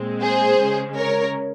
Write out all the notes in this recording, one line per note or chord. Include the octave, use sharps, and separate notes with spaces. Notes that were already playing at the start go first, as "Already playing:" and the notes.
Already playing: A#2 G#3 C4
G#4 C5
C#3 G#3 C#4
A#4 C#5